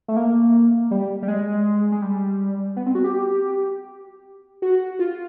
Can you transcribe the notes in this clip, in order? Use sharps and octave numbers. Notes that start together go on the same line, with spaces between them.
A3
A#3
G3
G3
G#3
G#3
G3
B3
C4
F#4
G4
F#4
F4